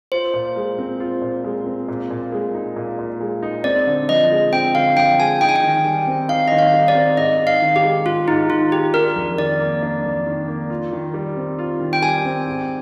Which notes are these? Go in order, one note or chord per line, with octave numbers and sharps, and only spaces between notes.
F4 C5
A#2
G#3
C4
F4
A#2
G#3
C4
A#2
A#2
G#3
D#4
A#2
A#2
G#3
D#4
C4 D5
D3
F3 D#5
G#3
C4 G5
D3 F5
F3 G5
G#3 G#5
D#4 G5
G#5
G5
D#3
G3
C4
D#4 F5
D#3 D#5
F5
G3
D5
C4
G#2 D#5
G#2
F5
D#3
G4
G#3
G#2 F4
G#2 D#4
D#3 F4
G#3 G4
D4 A#4
F2
D#3 D5
A#3
D4
F2
D#3
A#3
F4
D#3
G3
C4
F4
D#3
G5
G3 G#5
C4
G#2